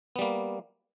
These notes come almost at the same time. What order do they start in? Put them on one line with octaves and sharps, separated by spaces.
B3 G3 A#3